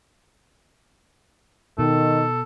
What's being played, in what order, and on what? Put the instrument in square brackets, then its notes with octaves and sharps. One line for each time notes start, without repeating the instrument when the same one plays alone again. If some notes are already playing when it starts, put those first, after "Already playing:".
[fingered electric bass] B2 [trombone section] D#3 [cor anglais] A4